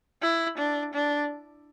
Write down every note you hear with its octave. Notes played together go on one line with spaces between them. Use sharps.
E4
D4
D4